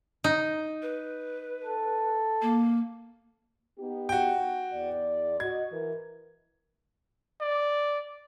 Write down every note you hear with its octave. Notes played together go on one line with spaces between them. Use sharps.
D#4
B4
A4
A#3
B3 D#4 G4
F#4 G5
E2 D5
F#4 D#5 G#6
E3 A#4 B4
D5